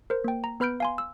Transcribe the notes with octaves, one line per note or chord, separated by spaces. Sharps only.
A#4 C5
A#3 G5
A#5
B3 B4 B5 F6 G6 D7
F5 G#5 C6
E6